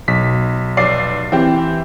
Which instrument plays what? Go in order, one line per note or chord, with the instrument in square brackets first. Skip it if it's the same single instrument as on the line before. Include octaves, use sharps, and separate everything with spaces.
[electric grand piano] B1 [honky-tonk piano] B6
[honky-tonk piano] F1 D5 C7
[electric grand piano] E3 [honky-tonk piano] C4 G4